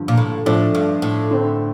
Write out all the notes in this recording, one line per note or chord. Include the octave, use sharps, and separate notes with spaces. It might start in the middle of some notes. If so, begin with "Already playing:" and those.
Already playing: G2 D3 F3
A#2
A2
A2 F3 A3 D4 A4
G2
A2
D3 A3 C4